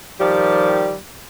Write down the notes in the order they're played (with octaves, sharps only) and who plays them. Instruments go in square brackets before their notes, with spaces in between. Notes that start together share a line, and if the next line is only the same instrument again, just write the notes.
[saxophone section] D#3 F3 G3 G4